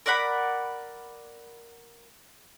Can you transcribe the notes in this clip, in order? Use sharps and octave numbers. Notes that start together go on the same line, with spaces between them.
A#4 D5 F#5 B5